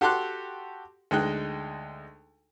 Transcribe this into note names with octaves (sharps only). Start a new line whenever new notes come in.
F#4 G4 A4 C6 D6 F#6
D2 G#3 D#4 G5 F#6